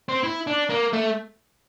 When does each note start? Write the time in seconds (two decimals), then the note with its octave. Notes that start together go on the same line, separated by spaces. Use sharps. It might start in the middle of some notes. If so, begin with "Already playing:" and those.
0.08 C4
0.23 E4
0.47 D4
0.69 A#3
0.93 A3